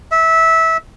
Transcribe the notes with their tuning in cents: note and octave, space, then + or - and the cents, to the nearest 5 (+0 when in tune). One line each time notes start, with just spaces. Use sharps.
E5 -20